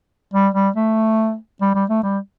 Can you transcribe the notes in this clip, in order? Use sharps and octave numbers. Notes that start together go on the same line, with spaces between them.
G3
G3
A3
G3
G3
A3
G3